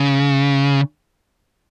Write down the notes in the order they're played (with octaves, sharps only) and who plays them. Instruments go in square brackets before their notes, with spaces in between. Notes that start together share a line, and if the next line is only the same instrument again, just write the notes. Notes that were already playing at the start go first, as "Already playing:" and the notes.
Already playing: [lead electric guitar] C#3